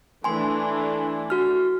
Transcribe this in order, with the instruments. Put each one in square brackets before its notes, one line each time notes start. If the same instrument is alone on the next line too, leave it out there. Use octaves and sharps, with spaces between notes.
[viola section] E3 A3 D4 [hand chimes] G#5 C6
[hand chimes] F#4 F6